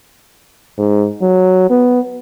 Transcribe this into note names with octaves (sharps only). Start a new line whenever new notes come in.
G#2
F#3
B3